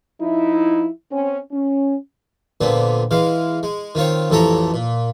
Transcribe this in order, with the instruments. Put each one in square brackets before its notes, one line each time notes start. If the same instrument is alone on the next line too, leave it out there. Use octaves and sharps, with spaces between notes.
[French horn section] F3 D#4 E4
C4 C#4
C#4
[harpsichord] A#2 D3 B3 C4
E3 G#3 F5
G#3
D#3 C4 F4 C#5
A1 F2 A2 A4 C#5 A#5
A#2